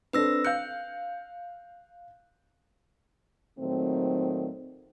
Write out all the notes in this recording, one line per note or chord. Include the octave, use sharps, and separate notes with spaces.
C4 D4 A4 B4 E6 A#6
F5 F#6 G6 C#7
A#2 D#3 F#3 A3 C4